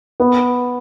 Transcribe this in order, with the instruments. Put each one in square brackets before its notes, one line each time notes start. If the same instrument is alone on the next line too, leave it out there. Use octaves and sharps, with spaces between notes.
[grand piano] B3